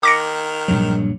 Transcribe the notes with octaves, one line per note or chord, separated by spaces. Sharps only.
D#3 D6 A#6 C#7
A#1 G2 F#3